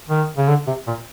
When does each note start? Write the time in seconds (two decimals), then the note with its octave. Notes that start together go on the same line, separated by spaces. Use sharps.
0.10 D#3
0.38 C#3
0.48 D3
0.67 C3
0.87 A#2